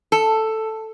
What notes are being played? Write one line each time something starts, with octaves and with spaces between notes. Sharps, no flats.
A4